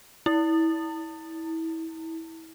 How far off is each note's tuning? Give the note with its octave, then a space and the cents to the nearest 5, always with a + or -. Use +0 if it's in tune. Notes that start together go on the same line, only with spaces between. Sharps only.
E4 -25